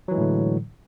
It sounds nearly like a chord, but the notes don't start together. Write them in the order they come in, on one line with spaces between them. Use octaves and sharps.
F#3 E3 G#3 A2 D3